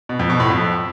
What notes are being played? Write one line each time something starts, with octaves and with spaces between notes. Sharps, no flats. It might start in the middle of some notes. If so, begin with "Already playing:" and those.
B2
F2
B2
A2
F2